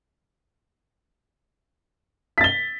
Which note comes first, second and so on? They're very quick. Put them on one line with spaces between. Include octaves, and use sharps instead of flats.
B6 A6 G7